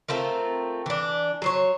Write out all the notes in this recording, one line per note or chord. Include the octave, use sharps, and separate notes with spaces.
A3 C4 F4 A#4
E3 D4
F#3 C5 C#5